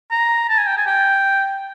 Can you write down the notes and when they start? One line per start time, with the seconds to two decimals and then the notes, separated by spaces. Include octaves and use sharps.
0.11 A#5
0.49 A5
0.58 G#5
0.67 G5
0.77 G#5
0.87 G5